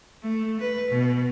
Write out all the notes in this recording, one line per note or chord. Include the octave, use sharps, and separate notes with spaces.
A3
B4
B2